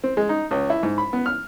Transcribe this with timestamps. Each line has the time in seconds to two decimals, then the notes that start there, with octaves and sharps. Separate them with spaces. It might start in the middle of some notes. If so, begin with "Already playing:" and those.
0.04 C4
0.17 G#3
0.29 D#4
0.51 C#2
0.70 E4
0.83 G#2
0.98 B5
1.13 B3
1.26 F6